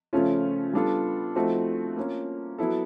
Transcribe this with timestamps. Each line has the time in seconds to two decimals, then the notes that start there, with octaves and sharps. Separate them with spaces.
0.13 C#3 F3 A3 C#4 F4
0.73 G3 B3 D4 F4 A4
1.35 F3 A3 C4 D#4 F#4
1.97 A#3 C#4 F4
2.59 F#3 B3 E4 A4